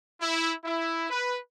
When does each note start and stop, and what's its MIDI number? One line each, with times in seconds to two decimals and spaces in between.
0.21 0.53 64
0.64 1.06 64
1.10 1.37 71